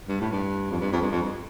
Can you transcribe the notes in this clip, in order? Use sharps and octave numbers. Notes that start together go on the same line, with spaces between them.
G2
A2
G2
F2
G2
F2
G2
F2
G2